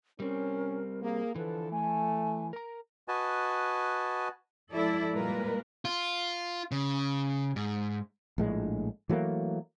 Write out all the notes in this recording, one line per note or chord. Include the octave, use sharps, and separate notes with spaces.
G3 C4 C#4 A#4
A#3 G#4
D3 E3 F3 A4 B4
A3 G#5
A#4 A#5
F#4 B4 D#5 G#5 A5
F3 G#3 E4 A4 D5
A#2 G3 G#3 A#3 A#4 B4
F4
C#3
G#2
A#1 A2 G#3
E3 F#3 A3 A#3